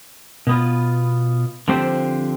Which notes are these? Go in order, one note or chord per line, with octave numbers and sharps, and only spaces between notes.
B2 B3 F4
D3 F3 C4 G4 C5